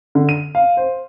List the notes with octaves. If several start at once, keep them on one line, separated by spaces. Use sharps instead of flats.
D3
D#7
F5
C5